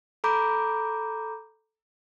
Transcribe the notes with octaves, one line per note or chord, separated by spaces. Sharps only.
A4 A#5 B5 D6 G6